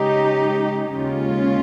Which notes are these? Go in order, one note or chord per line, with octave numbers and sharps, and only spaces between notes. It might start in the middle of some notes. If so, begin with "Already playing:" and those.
Already playing: C#3 G#3 C#4 D#4 G4
D#2 C#3 G#3 C#4 F4